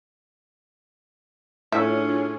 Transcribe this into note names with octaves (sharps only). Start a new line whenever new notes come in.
A2 C#4 D4 F4 G#4 E5